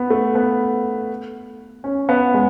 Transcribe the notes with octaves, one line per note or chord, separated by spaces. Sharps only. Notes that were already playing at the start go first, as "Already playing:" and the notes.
Already playing: B3
A3
B3
C#4
B3
G#3